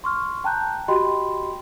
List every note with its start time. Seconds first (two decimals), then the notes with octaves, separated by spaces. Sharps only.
0.04 C6 C#6 F6
0.44 G5 A5 A#5 F#6 G6
0.88 F#4 G4 D#5 G5 B5 C6